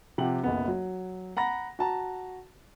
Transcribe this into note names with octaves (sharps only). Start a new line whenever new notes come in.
C3 F3 G4 F#5 F#7
F#1 B1 B3
F#3
F#5 A#5 B5 A#6
F#4 A5 A#5